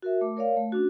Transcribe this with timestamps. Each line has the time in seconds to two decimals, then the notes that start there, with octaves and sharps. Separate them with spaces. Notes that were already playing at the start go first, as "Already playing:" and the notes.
0.02 F#4 A#4 E5
0.21 A3 D6
0.37 A#4 C#5 D5 F5
0.56 A3
0.72 C#4 D4 F#4